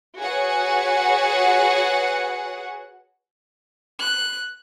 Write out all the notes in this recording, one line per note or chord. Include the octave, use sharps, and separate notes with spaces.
F#4 G#4 B4 C#5 F#5
F#6